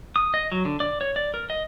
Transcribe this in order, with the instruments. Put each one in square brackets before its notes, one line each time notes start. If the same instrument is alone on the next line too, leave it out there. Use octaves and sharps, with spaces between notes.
[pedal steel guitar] D#6
D#5
F#3
D3
D5
C#5
D5
A#4
D#5